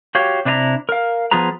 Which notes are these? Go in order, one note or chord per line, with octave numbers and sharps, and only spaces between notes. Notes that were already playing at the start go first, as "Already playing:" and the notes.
F#4 G4 C#5 F5
C3 D4 E4 A#4 A#5
A#4 F5
F3 B3 F4 G#4 B4 A#5